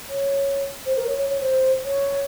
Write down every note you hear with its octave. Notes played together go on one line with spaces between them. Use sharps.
C#5
C5
A#4
C#5
C#5
C#5
C5
C#5